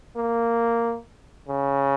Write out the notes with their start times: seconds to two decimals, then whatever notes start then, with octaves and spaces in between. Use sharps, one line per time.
0.16 A#3
1.48 C#3